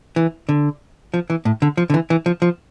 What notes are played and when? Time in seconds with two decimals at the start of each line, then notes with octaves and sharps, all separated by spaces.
0.16 E3
0.49 D3
1.14 F3
1.30 E3
1.45 A2
1.62 D3
1.77 F3
1.90 D3
1.94 E3
2.10 E3
2.26 F3
2.42 F3